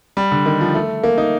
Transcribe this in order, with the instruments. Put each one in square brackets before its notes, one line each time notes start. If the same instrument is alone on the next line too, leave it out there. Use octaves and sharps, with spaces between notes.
[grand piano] G3
D3
D#3
F3
A3
A#3
D#4